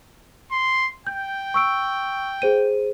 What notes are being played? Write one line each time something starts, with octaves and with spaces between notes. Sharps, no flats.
C6
G5 G6
C#6 E6 D7
G#4 C5 D#7